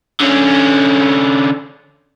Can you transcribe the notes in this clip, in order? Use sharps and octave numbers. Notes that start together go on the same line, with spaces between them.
D3 C#4